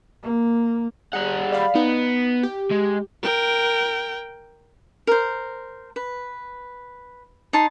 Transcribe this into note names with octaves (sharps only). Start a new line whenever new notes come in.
A#3
G3 G#4 F#5
D5 F5 B5
B3 D#4
G4
G#3
A#4 G5
A#4 C5
B4
D#4 A5 C6